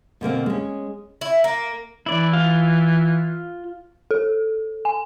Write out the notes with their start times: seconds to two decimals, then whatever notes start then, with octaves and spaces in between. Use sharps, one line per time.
0.21 B2 D3 A#3 C4
0.46 G#3 C#4
1.21 E4
1.44 A#3
2.06 E3 E4 D5
2.33 F4 F5
4.11 A4
4.85 G#5